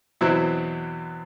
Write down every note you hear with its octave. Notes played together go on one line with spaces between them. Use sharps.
E2 B2 F#3 C4 E4